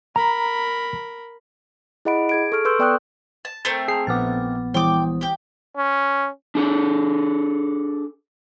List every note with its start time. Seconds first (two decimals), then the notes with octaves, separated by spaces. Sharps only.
0.16 A#4 A#5 B5
2.05 E4 G#4 D#5 F#5 B5 D7
2.29 G#4 G#6 D7
2.52 A4 C#6 F6 D7
2.65 A4 B4 C6 C#6 E6 G6
2.79 B3 D5 G5 C#6 D#6 F#6
3.45 A5
3.65 A3 C4 A#4 A6
3.88 G#4 G#5 A5 C7
4.07 A#1 B3 D6 F6 A6
4.74 E3 E4 G5 D6 D#6
5.21 G4 G5
5.77 C#4
6.55 D4 G#4 A4